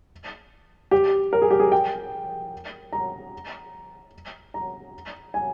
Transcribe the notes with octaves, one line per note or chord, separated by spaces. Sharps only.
G4
A#4
G#4
G4
G#4
G5
A#5
A#5
G#5